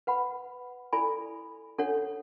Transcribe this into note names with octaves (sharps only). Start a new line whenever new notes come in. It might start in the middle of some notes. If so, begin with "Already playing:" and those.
B4 F#5 B5
E4 A4 D5 G#5 B5
D4 A4 C#5 F#5